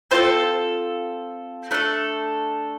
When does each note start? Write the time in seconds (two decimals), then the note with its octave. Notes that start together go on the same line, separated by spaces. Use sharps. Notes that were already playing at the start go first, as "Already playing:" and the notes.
0.11 C4 F4 A4 C5
1.71 A3 D4 A4